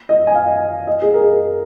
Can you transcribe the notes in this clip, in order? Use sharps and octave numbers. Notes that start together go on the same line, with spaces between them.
D#5
G#5
F5
D#5
G#4
A#4